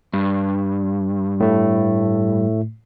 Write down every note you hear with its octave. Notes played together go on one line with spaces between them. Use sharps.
G2
A2 A3